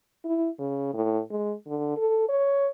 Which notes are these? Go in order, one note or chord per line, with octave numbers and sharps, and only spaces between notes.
E4
C#3
A2
G#3
D3
A4
C#5